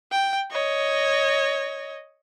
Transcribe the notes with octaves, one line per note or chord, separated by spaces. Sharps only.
G5
C#5 D#5